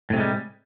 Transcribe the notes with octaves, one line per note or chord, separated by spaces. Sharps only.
A2 C3 G3 G#3